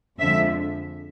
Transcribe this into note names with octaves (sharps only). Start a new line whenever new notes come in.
F2 D3 F3 G#3 E5